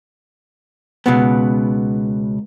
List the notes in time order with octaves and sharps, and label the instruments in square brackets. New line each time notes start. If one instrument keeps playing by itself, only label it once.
[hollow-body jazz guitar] C#2 B2 B3